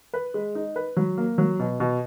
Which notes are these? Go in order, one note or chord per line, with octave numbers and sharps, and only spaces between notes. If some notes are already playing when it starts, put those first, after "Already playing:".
B4
G#3
D#4
B4
F#3
A#3
F#3
B2
B2